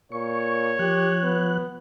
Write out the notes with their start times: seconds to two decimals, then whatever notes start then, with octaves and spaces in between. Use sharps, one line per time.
0.12 A#2 C#5 C#6
0.79 F3 G4 F#6
1.23 B3